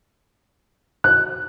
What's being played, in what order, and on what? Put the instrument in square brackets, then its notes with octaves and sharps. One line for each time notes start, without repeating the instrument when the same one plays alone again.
[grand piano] F#6